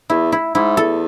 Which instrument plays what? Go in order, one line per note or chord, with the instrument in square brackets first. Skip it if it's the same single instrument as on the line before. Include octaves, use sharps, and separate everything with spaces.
[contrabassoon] E2 [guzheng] E4
[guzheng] E4
[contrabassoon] G#2 [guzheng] E4
[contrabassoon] E2 [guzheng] A4